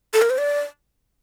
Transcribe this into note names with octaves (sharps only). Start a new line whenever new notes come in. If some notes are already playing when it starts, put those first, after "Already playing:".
A4
A#4
C5
D5